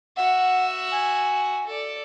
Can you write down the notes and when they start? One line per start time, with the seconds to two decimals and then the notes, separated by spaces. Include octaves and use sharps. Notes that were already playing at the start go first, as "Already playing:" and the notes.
0.17 F#4 E5 F#5
0.92 G#5
1.67 A4 D5